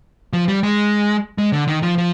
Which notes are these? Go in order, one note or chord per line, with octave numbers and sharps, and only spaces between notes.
F3
G3
G#3
G#3
D3
D#3
F3
F3